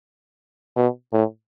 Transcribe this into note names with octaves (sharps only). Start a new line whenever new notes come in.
B2
A2